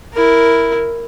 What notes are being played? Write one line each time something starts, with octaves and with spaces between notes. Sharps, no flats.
E4 A#4